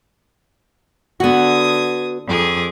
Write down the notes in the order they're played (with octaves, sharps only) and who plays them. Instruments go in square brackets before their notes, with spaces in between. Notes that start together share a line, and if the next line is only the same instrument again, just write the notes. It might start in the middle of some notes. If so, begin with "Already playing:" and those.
[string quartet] D3 D#6 G#6 [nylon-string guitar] B3 F#4
[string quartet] F2 G#4 D6